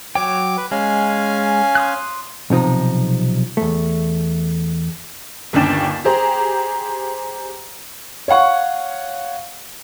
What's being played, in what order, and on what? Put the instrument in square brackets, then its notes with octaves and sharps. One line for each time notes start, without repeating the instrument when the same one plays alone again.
[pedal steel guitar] F#3 C#5 G5 [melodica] D6
[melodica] B4
[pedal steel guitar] G#3 [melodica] C#4 F5 G#5
[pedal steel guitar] C6 D#6 F#6
[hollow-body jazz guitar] B1 C3 F3 D#4
E2 A3
[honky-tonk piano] G1 D#2 C#4 D4 G5 E7
G4 G#4 C5 A#5
[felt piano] C#5 F5 F#5 C#6